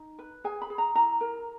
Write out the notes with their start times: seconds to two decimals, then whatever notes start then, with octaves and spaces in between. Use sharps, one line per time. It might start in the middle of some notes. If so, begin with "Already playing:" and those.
Already playing: D#4
0.19 B4
0.44 G#4 G#5
0.62 B5
0.70 G#4
0.78 A#5
0.95 E4 A#5
1.21 A#4